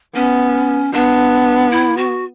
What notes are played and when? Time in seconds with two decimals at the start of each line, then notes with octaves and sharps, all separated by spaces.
0.15 B3 C#4
0.93 B3 D4
1.71 E4
1.97 F#4